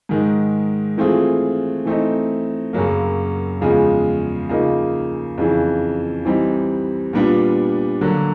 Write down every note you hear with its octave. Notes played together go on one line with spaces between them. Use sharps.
G#2 D#3 G#3
E3 A3 C4 F4 G#4
E3 A3 C4 D#4
F#2 C#3 F#3 A#3
E2 C#3 F3 G#3
C#3 F3 A#3 D#4
F2 C#3 E3
E3 G3 C4 D#4
A#2 G3 B3 D4 F4
D3 F#3 A#3